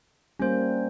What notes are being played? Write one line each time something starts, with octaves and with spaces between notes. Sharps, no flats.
G3 A#3 C#4 C5